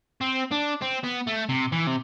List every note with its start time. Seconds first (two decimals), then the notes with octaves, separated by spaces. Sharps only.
0.21 C4
0.51 D4
0.82 C4
1.04 B3
1.27 A3
1.49 C3
1.72 E3
1.87 C3